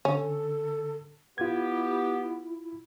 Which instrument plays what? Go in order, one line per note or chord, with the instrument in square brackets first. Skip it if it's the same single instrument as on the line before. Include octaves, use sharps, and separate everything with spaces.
[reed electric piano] D3 [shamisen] C#4 [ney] A4
[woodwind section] B3 G4 [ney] E4 [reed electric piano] F4 G#6